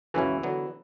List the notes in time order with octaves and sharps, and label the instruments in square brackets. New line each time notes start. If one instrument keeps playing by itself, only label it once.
[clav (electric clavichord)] C#2 C#3 F#3 C#4 E4 [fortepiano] E3
[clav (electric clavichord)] D3 F#3 B3